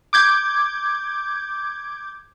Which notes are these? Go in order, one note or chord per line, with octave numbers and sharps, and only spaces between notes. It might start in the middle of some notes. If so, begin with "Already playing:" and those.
D6 G6 G#6